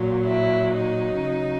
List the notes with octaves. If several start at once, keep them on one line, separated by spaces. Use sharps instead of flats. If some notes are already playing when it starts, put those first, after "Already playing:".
Already playing: A#2 F#3
E4
D#4
C#3 F#3